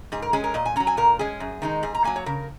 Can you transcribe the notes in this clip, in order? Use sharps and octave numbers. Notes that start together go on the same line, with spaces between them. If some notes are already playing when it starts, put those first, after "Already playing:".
G#2 G#4
A#4
G#3 C#4 G#4
A#4
A#2 D#5
G#5
F#3 C#4 A#5
G#5
A#2 A#4
G#3 C#4 G#4
F#2
D#3 G#3 D#4
G#2 G#4
A#5
F#3 A#3 G#5
C#5
C#3 A#4